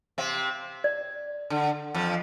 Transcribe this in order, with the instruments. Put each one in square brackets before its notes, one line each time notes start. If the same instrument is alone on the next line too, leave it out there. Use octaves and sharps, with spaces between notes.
[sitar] C3 C4 [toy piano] F5
[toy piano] D5
[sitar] D3
F2 F3